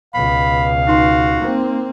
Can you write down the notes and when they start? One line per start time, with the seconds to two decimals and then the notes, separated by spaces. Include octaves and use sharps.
0.14 C#2 B2 F5 B5
0.88 D#4 F#4 C6 C7
1.39 A#3 C4